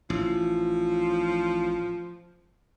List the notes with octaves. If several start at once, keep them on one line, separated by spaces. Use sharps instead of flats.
A1 F3